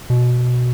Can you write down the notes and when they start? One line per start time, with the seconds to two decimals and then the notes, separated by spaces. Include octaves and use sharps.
0.10 B2